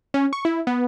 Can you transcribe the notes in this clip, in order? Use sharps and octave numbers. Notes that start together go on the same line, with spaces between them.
C#4
C#6
E4
B3